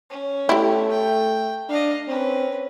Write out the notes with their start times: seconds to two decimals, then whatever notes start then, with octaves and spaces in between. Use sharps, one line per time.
0.10 C#4
0.49 A3 E4 G4
0.91 G5
1.69 D4 D#5 F5
2.08 C4 C#4 B4